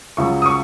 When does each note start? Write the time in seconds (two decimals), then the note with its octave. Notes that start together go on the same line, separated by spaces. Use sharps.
0.17 C#2 C#3 F#3 C#6
0.42 D#6
0.46 C#6